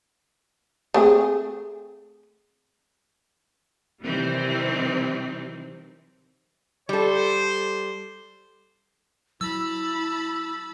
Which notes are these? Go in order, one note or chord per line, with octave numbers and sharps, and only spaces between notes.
A3 C4 G#4
C3 D#3 E3 F#3 G3 C4
G3 A4 C5
F#3 E4 A5 B5 E6